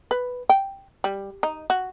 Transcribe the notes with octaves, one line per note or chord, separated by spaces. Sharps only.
B4
G5
G3
D#4
F#4